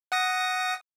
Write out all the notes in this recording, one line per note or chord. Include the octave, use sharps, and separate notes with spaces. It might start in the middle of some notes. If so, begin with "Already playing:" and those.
F#5 D#6 A#6